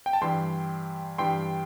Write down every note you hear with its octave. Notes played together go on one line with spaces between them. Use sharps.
G5
A5
G2 E3 G3 G5 C6
G2 E3 G3 G5 C6